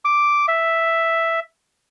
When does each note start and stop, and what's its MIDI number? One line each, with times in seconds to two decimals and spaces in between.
0.05 0.46 86
0.48 1.40 76